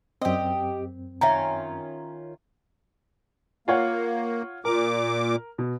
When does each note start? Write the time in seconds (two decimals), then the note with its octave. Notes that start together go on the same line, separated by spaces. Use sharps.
0.22 F#2 C4 G4 D#5
1.21 D#3 C#4 F4 E5 A#5
3.68 A#3 F4 C#5 F#5
4.65 A#2 A#4 D6
5.58 B2